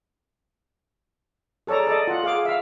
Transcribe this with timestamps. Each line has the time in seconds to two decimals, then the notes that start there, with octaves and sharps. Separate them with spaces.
1.67 G#4 A4 C#5 D5 A#5
1.87 A4 D5 D#5
2.08 F4 F#5
2.24 G#4 F5 D6
2.45 E5 F5